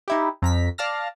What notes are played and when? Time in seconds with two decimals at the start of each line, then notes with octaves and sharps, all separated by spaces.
0.08 D#4 E4 G4
0.42 F2 A#5 B6
0.78 D5 F5 A5 F6 A#6